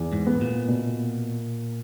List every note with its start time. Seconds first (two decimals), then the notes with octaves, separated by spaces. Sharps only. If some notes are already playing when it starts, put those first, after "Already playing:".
Already playing: E2
0.13 G#2
0.27 B3
0.41 A#2
0.68 B2